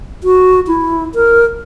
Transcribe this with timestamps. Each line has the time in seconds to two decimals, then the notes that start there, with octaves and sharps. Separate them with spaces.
0.24 F#4
0.67 E4
1.15 A#4